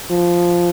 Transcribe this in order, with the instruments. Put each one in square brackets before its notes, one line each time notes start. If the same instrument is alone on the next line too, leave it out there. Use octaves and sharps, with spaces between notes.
[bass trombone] F3